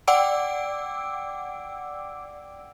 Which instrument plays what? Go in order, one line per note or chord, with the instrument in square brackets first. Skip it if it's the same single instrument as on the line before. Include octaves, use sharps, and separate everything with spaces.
[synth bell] D5 F#5 G5 D6 E6 D7